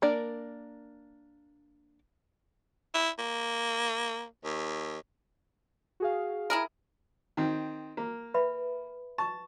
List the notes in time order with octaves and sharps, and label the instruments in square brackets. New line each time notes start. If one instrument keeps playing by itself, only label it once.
[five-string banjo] A#3 D4 A#4 D5
[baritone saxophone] E4
A#3
D#2
[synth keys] F#4 G#4 F5
[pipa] E4 G#4 A#4
[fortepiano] D#3 C4
A#3
[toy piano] B4 E5 B5
[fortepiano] A5 [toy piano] C#6